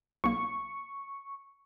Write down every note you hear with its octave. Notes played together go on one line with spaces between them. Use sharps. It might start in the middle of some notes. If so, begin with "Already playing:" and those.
B1 A#3 C#6